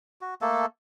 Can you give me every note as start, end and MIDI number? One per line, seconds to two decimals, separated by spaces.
0.21 0.34 66
0.41 0.66 57
0.41 0.66 58
0.41 0.66 69